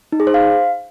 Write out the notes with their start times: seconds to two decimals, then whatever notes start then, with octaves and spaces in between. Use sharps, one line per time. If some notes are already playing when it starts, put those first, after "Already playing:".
0.12 D#4
0.20 G#4
0.27 C5
0.34 F5